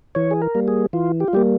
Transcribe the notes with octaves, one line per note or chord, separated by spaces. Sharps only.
E3 C#5
G#4
A#4
G3 A#3
G#4
E3 F4
G4
F4
G3 A#3 G4